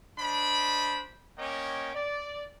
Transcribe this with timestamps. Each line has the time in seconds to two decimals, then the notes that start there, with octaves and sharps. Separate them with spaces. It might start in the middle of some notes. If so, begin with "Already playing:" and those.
0.19 D4 C5 D#5 B5
1.38 A#3 C#4 C#5 D#5 G5 D6
1.95 D5